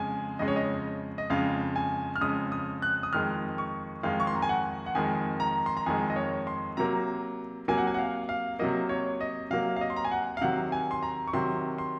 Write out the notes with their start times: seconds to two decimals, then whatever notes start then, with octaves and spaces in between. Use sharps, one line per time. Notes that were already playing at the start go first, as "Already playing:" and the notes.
Already playing: F2 C#3 G#3 G#5
0.39 F2 C#3 G#3 D#5
0.48 C#5
0.56 D#5
1.18 D#5
1.30 F2 C#3 G#3 F5
1.76 G#5
2.16 F6
2.21 F2 C#3 G#3 D#6
2.52 D#6
2.82 F#6
3.03 D#6
3.13 F2 D#3 G#3 F6
3.58 C#6
4.03 F2 D#3 G#3 F5
4.20 C#6
4.27 C6
4.35 A#5
4.42 G#5
4.49 F#5
4.86 F#5
4.95 F2 D#3 G#3 G#5
5.40 A#5
5.66 C6
5.77 A#5
5.86 F2 D#3 G#3 G#5
6.10 D#5
6.16 C#5
6.47 C6
6.77 C3 F#3 A#3 A#5
7.68 C3 F#3 A#3 G#5
7.78 F#5
7.87 G#5
7.94 F#5
7.99 F5
8.29 F5
8.59 C3 F#3 A#3 D#5
8.89 C#5
9.21 D#5
9.50 C3 F#3 A#3 F5
9.76 F5
9.81 D#5
9.90 C6
9.96 A#5
10.05 G#5
10.11 F#5
10.37 F5
10.41 C3 D#3 F#3 F#5
10.72 G#5
10.91 C6
11.03 A#5
11.28 C#6
11.33 C3 D#3 F#3 C6
11.78 C6